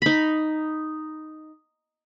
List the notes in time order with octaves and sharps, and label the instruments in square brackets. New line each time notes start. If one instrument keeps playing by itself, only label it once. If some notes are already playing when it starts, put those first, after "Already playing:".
[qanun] D#4 B5